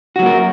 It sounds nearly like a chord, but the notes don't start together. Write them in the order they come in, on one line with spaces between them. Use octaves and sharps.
F#4 F#3 A#3 A#4